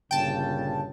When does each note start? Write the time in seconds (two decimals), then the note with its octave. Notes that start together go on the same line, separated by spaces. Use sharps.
0.11 G1 A#2 C#3 G5 A5